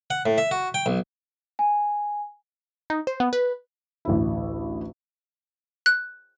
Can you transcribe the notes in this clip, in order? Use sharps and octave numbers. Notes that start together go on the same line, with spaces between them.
F#5
A2
E5
F#4
G5
B1
G#5
D#4
C5
B3
B4
A1 D2 E4
F#6